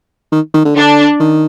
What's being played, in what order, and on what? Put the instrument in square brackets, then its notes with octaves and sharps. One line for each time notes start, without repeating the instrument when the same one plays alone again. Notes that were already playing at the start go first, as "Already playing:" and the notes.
[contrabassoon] D#3
D#3
D3
[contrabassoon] D3 [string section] D4
[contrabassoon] D#3